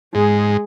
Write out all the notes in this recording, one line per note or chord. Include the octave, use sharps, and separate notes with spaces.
G#2 G#3